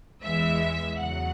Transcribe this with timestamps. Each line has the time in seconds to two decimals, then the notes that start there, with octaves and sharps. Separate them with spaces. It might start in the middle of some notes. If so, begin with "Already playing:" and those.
0.24 E2 E3 G#3 E5
1.00 E2 C#3 F#3 F#5